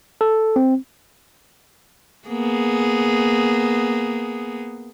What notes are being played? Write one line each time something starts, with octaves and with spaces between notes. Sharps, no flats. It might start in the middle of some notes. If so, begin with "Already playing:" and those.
A4
C4
A#3 B3 G#4